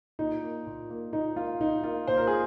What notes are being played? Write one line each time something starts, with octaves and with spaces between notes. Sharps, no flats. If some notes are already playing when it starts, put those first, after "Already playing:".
A#2 D#4
A#3
A#2
A#3
A#2 D#4
A#3 F4
A#2 D#4
A#3 F4
A#2 C5
A#4
G#4